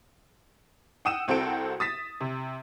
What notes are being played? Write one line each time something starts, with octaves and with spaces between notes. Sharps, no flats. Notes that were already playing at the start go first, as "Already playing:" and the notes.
F#5 G5 D#6 E6 D#7 E7
C2 C4 F#4 A4 G5 D7
D#6 A6 B6 E7
C3